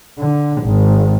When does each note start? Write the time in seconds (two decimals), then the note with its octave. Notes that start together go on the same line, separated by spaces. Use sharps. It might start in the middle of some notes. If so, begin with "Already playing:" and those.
0.19 D3
0.62 G#1